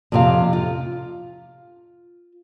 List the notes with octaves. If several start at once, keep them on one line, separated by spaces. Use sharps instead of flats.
F2 C3 F5
F4